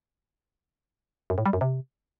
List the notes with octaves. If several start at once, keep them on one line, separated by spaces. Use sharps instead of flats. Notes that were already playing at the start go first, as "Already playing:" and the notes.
F#2
A2
G3
F#2
C3